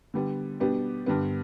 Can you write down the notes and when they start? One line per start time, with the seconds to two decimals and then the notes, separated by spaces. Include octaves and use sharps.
0.14 D3 G3 B3
0.60 B2 G3 B3 D4 G4
1.06 G2 D3 G3 B3